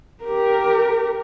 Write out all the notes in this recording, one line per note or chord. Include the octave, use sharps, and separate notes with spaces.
G4 A#4